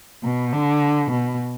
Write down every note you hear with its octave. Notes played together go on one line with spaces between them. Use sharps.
B2
D3
B2